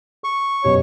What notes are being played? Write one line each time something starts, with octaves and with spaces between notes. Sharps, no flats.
C#6
F#1 B2 G4 C#5